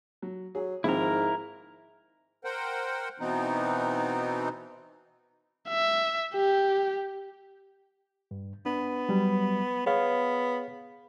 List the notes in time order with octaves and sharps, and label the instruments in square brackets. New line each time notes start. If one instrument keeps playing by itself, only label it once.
[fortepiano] F#3
[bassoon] F#3 [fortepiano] G#4
[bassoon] G#2 [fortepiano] D#3 F3 C4 [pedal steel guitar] E4 A#4
[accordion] A#4 C5 F#5 G5
B2 E3 B3 C4 D#4
[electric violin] E5
G4
[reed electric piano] G2
[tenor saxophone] B3 [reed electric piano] D4
[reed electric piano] F#3 G3
[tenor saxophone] B3 [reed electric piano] G#4 C#5 F5